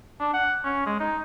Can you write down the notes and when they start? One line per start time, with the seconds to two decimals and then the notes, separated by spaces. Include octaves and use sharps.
0.20 D4
0.34 F#5
0.64 C#4
0.86 G#3
1.00 D#4